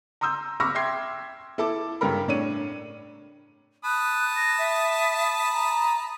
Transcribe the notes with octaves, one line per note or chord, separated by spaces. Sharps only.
A#5 C6 D#6 E6 G6
B5 C#6 D6 E6 F6 A#6
E5 G5 C6 D6 G#6 C7
E4 A4 A5 D6
G2 C#3 G3 A4 A#4 B5
A2 D4 C#5 D#7
A5 B5 D#6 F#6
A#6
E5
A#5